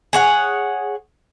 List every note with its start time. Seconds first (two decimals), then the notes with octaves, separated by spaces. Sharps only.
0.13 G#4 C#5 F#5